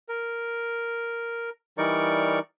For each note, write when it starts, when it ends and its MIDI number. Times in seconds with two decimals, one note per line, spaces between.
0.09 1.50 70
1.78 2.39 52
1.78 2.39 55
1.78 2.39 63
1.78 2.39 70
1.78 2.39 74
1.78 2.39 85